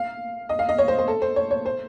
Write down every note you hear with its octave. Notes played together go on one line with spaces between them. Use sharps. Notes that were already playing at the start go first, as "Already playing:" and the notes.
Already playing: F5
D#5
F5
D#5
C#5
C5
C5
A4
C5
C#5
C#5
C5